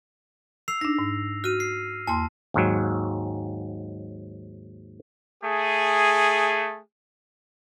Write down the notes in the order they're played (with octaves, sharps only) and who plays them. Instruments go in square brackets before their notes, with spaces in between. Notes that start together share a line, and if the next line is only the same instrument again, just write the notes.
[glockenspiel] E6 C7 F7
[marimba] D4 D#4 [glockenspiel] A#6
[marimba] G#2
[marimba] F#4 [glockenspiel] F6 D#7
[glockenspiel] C7
[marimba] E2 A#3 C6 [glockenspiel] A5
[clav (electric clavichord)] D#2 G#2 F#3
[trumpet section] A3 G#4